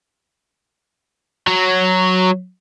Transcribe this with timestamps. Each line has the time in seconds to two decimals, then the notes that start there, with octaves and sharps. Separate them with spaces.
1.47 F#3